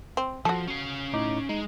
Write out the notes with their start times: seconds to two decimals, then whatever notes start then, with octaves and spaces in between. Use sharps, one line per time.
0.17 C4
0.45 F3 F#4 A4
0.67 C#4 F5
1.13 A2 D#4 D6
1.49 G#3 D#4